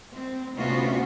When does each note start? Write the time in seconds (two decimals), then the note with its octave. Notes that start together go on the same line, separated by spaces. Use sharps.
0.13 C4
0.56 D2 C3 B3 C#4 F4 F#4